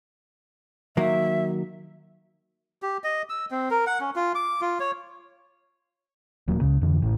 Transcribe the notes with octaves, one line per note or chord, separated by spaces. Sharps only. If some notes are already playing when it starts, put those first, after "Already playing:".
D#3 F#3 A#3 E5
G4
D#5
E6
C4
A#4
F#5
C#4
F4
D6
F4
C#5
D#1 F#3 A#3
C#2 C#3
F2 D3 E3
A1 A2